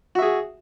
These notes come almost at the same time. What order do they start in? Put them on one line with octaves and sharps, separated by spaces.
F#4 E5 G#4